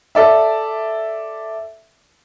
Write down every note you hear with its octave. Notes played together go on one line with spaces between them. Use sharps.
A4 D5 E5